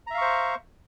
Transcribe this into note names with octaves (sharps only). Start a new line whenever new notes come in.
C5 E5 F5 A#5 C#6